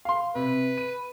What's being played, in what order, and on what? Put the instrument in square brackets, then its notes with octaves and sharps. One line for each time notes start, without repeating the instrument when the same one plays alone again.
[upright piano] F5 C6
[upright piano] C3 [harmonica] B4
[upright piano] D#7